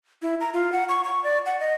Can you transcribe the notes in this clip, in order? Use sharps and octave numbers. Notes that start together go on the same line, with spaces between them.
E4
A#5
F4
F#5
C#6
C#6
D5
F#5
D#5